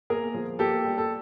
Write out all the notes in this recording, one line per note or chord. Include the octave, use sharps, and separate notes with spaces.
A#3 G#4 A#4
F3
A#3 G4 A4
G3
A4